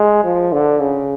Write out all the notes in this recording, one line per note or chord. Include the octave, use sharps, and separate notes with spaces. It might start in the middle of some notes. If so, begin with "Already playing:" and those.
Already playing: G#3
F3
D3
C#3